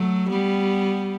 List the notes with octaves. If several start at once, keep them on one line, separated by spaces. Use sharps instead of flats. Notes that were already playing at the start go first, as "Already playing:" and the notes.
Already playing: F#3 A3
G3 B3